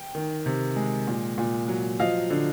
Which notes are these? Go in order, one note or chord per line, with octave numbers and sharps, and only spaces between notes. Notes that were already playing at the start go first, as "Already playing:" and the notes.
Already playing: G5
D#3
C3
G#3
A#2
A#2
F#3
F3 D#5 F5
D3